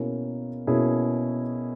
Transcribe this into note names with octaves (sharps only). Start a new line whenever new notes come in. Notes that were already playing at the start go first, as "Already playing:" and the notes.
Already playing: B2 A#3 C#4 E4 G#4
B2 A#3 C#4 E4 G#4